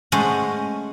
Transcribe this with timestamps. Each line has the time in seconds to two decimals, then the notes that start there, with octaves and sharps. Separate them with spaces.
0.12 G#3 A3 C#4 C5 D#5 F#5